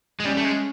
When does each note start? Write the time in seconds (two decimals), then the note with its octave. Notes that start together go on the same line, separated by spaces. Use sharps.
0.20 G#3
0.25 G3 C#4
0.37 A3
0.45 G#3